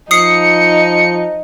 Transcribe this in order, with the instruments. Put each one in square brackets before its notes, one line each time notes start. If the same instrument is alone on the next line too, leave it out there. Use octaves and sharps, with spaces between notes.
[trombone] F3 [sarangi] D#4 [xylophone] D#6 C7 [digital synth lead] C#7